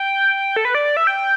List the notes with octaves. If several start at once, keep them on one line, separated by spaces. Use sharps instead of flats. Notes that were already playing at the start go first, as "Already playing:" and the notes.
Already playing: G5
A4
B4
D5
D5
E5
G5
G5